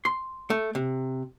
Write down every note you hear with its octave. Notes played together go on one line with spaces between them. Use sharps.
C6
A3
C3